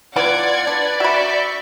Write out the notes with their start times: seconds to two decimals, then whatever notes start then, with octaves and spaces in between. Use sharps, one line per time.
0.16 E3 B3 F4 D5 F#5 G#6
0.67 D4 B4
1.00 F#4 E5 B5 C#6 G6 B6